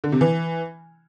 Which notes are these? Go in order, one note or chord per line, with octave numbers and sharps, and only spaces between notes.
D3
C3
E3